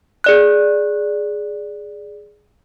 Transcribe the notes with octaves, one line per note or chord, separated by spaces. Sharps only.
G#4 D5 F#6